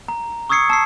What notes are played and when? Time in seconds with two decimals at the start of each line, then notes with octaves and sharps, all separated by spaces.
0.08 A#5
0.49 C#6 D#6 E6 G#6 C7 C#7
0.70 A5 E6 C7